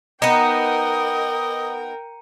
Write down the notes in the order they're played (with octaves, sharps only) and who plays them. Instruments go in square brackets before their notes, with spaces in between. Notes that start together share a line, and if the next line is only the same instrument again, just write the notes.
[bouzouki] B3 D#4 [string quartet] A#4 G5 [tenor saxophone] D#5 [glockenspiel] A#5 C#7 D#7